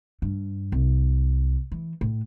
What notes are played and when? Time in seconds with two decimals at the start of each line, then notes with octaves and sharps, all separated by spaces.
0.22 G2
0.72 C2
1.72 E3
2.01 A2